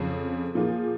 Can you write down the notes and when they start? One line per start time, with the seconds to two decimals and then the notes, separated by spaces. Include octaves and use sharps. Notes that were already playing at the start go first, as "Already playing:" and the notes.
Already playing: F2 C#3 F3
0.55 A#2 F3 A#3 F4 G#4